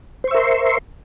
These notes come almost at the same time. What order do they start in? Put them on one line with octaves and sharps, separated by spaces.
C5 C#6 E5 A#4 C6